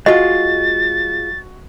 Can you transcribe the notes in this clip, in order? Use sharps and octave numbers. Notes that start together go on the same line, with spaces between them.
G#3 F4 F#4 D#5 A6